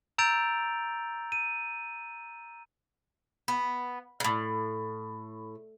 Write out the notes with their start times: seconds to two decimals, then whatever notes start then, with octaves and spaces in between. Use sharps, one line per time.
0.18 A#5 E6 G6 A6 D7 F7
1.32 D#7
3.48 B3
4.20 A2 C#3